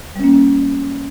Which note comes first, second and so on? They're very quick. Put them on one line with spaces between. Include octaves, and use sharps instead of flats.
G3 C#4 A#3